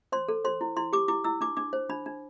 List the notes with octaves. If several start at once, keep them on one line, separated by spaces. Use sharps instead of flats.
C5 C6
A4
C5 C6
E4
E4 C6
G4 D6
E4 D6
E4 E6
D4 D6
D4 D6
C5
D4 B5
D4